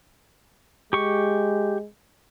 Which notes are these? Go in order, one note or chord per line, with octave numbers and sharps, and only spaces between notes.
G#3 G4 C#6